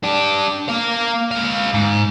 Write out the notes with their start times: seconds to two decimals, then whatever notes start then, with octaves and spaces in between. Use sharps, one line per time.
0.04 D4 G4
0.69 A#3 F5
1.31 G#3 F5
1.74 G#2